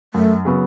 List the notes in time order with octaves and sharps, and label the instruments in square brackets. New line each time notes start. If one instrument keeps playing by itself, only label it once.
[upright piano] F#2 [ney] A3
[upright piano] C#3 F#3 B3